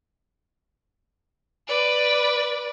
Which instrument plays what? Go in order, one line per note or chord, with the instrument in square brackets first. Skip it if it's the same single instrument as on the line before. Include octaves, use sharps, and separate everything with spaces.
[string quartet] B4 D5